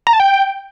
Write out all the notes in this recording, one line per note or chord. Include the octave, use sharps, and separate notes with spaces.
A#5
A5
G5